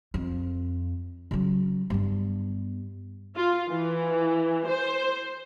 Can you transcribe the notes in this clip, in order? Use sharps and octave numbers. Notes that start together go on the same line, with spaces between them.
F2
C#3 F#3
G2 B3
F4
E3
C5